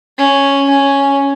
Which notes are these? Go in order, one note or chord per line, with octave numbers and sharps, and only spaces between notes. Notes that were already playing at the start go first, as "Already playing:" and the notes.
C#4
C#4